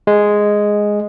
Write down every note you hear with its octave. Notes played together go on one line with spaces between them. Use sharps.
G#3